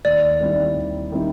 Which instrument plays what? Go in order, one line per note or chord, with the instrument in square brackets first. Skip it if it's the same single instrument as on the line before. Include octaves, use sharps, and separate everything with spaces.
[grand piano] D#2 [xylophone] D5
[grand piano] D#3 G3 C4 E4
D#2
D#3 G3 C4 E4